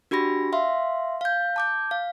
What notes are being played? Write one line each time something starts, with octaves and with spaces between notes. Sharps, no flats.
D4 F#4 G4 B5 A#6
E5 F5 C6
F5 G6
A5 D6 G6
F5